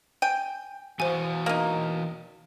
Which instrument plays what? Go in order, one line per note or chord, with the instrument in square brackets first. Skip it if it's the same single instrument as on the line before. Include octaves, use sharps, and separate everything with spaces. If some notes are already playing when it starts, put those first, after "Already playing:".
[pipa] G5 [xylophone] G#5
[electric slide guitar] E3 F#4 F5 [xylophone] C5 G#5
[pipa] A#3 D#4